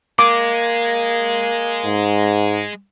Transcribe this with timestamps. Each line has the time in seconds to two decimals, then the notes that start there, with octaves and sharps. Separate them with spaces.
0.19 G#3 A#3 D6
1.85 G#2